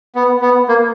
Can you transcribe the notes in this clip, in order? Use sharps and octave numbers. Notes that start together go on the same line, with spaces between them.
B3
B3
A#3